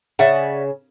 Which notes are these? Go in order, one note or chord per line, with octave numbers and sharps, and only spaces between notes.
C#3 D5 E5 F#5